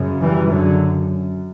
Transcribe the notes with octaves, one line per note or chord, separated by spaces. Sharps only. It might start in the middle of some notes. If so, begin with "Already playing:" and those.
Already playing: F#2 C#3
E3 G3
D3 F#3